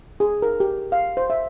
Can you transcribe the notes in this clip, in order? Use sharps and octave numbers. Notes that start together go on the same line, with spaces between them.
G#4
A#4
G4
F5
C5
E5